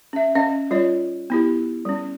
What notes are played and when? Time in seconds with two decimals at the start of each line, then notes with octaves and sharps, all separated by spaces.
0.13 C#4 E5
0.35 C#4 D#5 F5
0.71 G3 F4 C#5 D#5
1.30 B3 E4 G4
1.85 G3 C#4